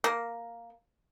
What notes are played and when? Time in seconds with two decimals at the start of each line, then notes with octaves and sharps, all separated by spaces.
0.04 A#3